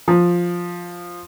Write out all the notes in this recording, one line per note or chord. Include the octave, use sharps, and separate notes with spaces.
F3